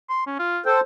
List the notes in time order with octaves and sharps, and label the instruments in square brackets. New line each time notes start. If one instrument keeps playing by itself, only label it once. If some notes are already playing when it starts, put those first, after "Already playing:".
[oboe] C6
C#4
F4
[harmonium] A4 C5 [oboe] G5